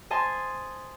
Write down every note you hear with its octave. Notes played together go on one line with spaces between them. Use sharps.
C5 D#5 G#5 A5 C6